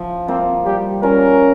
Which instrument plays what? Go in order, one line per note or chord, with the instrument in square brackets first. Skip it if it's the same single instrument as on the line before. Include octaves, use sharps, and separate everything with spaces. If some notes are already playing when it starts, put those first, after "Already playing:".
Already playing: [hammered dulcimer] F3
[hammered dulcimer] A#3 F4 [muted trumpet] C4
[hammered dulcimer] G3 [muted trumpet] G4
[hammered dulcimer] C#4 F4 [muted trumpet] A#4